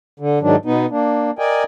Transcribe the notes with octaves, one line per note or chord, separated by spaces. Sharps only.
D3
G#2 D#3 F#3 D4
B2 B3 D#4
A#3 D4
A#4 D5 D#5 G5 G#5